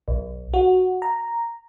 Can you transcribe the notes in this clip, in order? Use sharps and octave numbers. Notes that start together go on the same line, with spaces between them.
B1
F#4
A#5